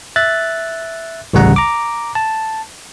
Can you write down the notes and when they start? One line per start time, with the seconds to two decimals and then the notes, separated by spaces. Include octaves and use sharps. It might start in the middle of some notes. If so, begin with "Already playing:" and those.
0.16 E5 F#6 A6
1.33 A1 D2 C#3 G3 F#5 A#5
1.56 A#5 D6
2.15 A5